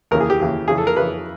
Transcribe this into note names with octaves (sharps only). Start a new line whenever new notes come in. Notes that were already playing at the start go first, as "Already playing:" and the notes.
D#2 C#3 E3 A#4
G#4
G4
D#2 C#3 E3
F2 C#3 E3 G#4
A4
A#4
F2 C#3 E3 B4